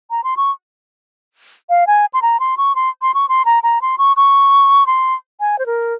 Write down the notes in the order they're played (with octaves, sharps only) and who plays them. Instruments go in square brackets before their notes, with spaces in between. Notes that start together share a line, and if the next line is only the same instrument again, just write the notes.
[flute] A#5
C6
C#6
F5
G#5
C6
A#5
C6
C#6
C6
C6
C#6
C6
A#5
A#5
C6
C#6
C#6
C6
G#5
C5
A#4